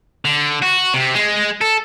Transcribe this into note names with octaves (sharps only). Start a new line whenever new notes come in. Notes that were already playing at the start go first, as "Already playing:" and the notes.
D3
F#4
C3
G#3
A4